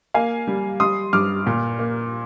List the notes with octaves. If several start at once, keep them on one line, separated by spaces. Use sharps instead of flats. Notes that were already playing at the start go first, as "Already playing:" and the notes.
A#3 F5 G#5
G3
G3 C6 D#6
G2 D6 F6
A#2
A#3